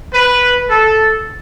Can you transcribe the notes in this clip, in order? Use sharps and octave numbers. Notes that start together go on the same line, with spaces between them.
B4
A4